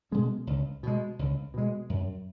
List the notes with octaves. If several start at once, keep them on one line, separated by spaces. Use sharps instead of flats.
B2 G#3 C#4
C#2
B2 G#3
C#2
B2 G#3
F#2